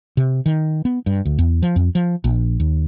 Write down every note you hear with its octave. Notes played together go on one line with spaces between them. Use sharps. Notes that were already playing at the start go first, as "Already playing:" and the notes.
C3
D#3
B3
G2
D2
E2
F3
F2
F3
A#1
D#2